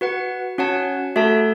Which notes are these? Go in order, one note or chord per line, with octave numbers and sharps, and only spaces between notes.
F#4 B4 F#5
C#4 F#4 C#5 F#5 A5
A3 F#4 A4 E5 A5